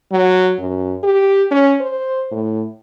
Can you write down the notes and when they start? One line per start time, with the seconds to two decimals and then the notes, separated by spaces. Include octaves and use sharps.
0.12 F#3
0.60 F#2
1.04 G4
1.51 C#4
1.81 C5
2.32 A2